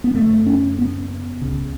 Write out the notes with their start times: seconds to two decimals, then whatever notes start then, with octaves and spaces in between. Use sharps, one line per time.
0.04 B3
0.14 F#2 C#3 A3
0.46 C#4
0.79 B3
1.41 C#2 C#3